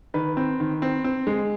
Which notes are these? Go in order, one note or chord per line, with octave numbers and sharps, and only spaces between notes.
D#3 B4
C4
D#3
C4
C4
G#3